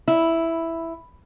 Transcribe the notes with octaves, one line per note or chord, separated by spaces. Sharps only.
E4